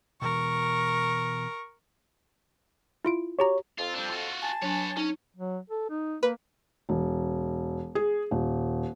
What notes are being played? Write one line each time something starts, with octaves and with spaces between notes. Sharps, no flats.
B2 E3 A#4 C#6
E4 F4 D7
F#4 G4 C#5 A#5
F2 F4 A4
G3 D4
F4 F#4
G#5 A5
F#3 D4 B4 C#5
C#4 D#4
F#3
A4
D#4
A#3 B4
E1
G#4
D#1